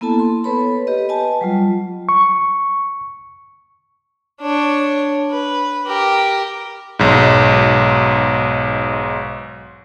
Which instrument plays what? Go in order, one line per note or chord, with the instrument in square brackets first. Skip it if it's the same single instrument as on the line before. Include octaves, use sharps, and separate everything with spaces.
[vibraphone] A#3 B3 E4 A4 A5
C6
B3 A4 B4 C#5 B5
G4 B4 D#5
D#5 G#5 A5
F#3 G3 F4
[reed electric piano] C#6
[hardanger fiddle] D4 C#5
B4
G4 A#4
[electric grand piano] B1 G#2